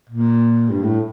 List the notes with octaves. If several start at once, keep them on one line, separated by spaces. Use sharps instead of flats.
A#2
G2
A2